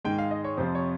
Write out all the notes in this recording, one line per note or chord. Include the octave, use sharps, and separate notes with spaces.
G#2 D#3 G#3 G5
F5
D#5
C#5
F2 C3 F3 C5
C#5